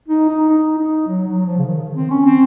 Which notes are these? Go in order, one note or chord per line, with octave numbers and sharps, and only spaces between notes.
D#4
D#4
D#4
D#4
F#3
F#3
F3
C#3
D#3
D#3
C4
C#4
C4